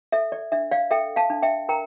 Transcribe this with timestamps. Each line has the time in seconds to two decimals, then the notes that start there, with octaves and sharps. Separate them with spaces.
0.12 A4 E5
0.32 D5
0.52 D4 E5
0.71 D5 F5
0.91 A4 E5 G5
1.16 F5 A5
1.30 D4
1.42 E5 G5
1.69 A#4 G5 A#5